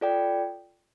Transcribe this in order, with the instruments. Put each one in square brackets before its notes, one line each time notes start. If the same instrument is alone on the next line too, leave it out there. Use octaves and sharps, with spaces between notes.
[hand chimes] F4 A4 D5 G5